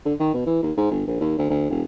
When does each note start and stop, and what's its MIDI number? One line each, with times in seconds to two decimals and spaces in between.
0.06 0.14 50
0.20 0.32 51
0.34 0.45 47
0.46 0.63 52
0.63 0.72 39
0.77 0.90 44
0.91 1.04 31
1.07 1.18 34
1.21 1.36 39
1.38 1.46 38
1.50 1.66 38
1.70 1.83 28